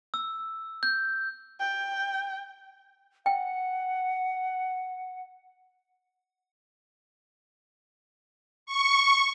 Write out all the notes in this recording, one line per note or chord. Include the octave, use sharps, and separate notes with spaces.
E6
G6
G5
F#5 G5
C#6